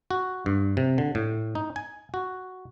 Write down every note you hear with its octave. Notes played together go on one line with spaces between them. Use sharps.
F#4
G2
C3
D3
A2
D#4
G#5
F#4